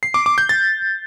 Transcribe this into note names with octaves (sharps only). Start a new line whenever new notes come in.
C7
D6
D6
G6
A6